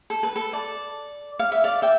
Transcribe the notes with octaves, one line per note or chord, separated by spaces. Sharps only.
A4
B4
A4
D5
F5
E5
D5 F5
E5 G5